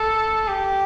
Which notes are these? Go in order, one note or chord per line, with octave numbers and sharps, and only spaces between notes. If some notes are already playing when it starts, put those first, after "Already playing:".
Already playing: A4
G4